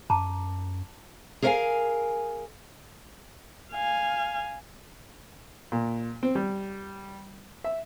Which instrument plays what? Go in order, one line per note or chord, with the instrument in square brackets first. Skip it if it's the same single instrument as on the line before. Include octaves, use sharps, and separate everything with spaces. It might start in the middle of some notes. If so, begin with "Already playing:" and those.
[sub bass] F#2 [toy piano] A5 A#5 D6
[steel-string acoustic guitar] G#4 A#4 C#5 E5 F5 G#5
[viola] F5 G#5
[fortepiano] A#2
C4
G3
E5